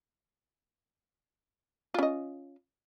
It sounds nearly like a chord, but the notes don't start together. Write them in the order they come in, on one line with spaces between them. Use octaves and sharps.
F4 C#4 D#5